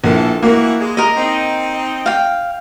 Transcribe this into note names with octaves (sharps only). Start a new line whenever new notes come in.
A#1 E3 A4
E3 A#3 F#4
G#3
A#4 D#5
C4 D#4
F5 G5